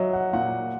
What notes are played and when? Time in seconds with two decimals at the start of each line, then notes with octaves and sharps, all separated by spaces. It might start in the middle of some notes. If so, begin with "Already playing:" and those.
Already playing: F#3 F#4 D#5 E5
0.13 F#5
0.33 A#2 F#5